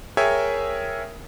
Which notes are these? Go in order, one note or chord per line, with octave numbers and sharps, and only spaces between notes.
G#4 A#4 C#5 E5 G5 G#5